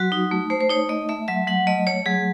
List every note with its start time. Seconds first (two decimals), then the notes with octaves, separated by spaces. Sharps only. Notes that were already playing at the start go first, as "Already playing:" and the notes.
Already playing: F#3 F#4
0.12 D#4
0.31 A3
0.50 A3 C5
0.61 C5
0.70 D#4 C#5
0.89 A3 D#5
1.09 A3 E5
1.28 F#3 E5
1.47 F#3 F#5
1.67 A3 D#5
1.87 A3 C#5
2.06 F#3 G#4